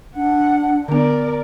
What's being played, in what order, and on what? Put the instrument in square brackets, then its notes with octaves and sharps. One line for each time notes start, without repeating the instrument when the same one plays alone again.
[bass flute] D4 [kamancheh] F#5
[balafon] D3 B3 [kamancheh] A#4 D5